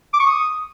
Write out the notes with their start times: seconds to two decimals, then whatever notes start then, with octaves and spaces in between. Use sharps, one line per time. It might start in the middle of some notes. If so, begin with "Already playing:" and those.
0.13 D6
0.20 C#6
0.27 D#6